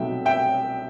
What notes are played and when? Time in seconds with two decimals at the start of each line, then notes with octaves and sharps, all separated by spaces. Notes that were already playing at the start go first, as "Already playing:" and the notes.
Already playing: C2 B2 F#3 A3 D#4 E5 G5
0.26 E5 G5